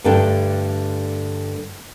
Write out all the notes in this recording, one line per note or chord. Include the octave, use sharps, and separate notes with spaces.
G2 D3 A3 D4 G5